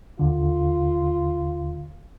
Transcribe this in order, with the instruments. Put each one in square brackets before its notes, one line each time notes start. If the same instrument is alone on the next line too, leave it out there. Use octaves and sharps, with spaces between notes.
[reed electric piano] D#2 D3 [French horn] F4